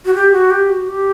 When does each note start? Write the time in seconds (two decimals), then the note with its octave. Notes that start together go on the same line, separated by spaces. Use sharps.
0.05 F#4
0.14 G4
0.32 F#4
0.51 G4
0.69 F#4
0.87 G4